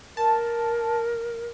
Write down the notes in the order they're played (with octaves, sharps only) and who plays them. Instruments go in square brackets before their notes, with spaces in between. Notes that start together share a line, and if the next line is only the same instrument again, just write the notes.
[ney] A#4 [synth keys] A5